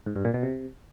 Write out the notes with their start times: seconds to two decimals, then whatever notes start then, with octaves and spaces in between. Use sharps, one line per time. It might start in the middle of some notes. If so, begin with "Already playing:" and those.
0.06 G#2
0.16 G2
0.25 A#2
0.34 B2
0.43 C3